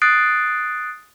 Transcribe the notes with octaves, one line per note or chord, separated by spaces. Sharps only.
D#6 F#6 A6 C7 D7